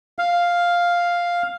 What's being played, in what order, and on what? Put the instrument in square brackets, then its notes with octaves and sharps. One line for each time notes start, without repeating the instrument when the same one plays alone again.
[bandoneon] F5